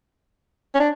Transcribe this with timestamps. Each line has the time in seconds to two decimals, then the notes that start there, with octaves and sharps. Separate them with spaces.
0.74 C#4
0.80 D4